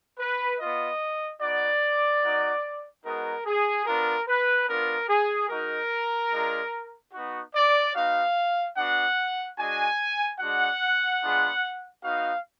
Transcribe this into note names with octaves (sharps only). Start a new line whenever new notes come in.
B4
B3 F4 D#5
B3 D#4 F#4 D5
A#3 D#4 F#4
G#3 B3 D#4 F#4 A#4
G#4
B3 D4 F4 A#4
B4
B3 D4 F4 A#4
G#4
G#3 D#4 F#4 A#4
G#3 D4 F4
B3 D#4 F#4
D5
B3 D#4 F#4 F5
B3 D4 F#4 F#5
G#3 D4 F#4 G#5
G#3 D4 F#4 F#5
G#3 B3 D4 F4
B3 D#4 F#4 F5